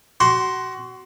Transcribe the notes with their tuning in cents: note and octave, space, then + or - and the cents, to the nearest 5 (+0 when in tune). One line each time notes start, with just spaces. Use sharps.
F#4 +25 C6 +0